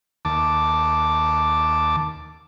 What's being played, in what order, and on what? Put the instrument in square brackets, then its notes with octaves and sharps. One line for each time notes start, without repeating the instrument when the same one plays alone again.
[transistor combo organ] D#2 A5 D6